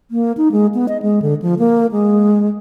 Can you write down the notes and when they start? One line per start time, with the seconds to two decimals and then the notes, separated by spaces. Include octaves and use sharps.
0.11 A#3
0.37 D#4
0.52 G#3
0.74 B3
0.88 D#5
1.02 G#3
1.22 D3
1.42 F3
1.59 A#3
1.92 G#3